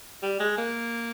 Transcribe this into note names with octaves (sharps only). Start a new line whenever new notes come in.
G3
G#3
A#3